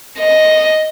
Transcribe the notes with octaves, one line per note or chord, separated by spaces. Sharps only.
D#5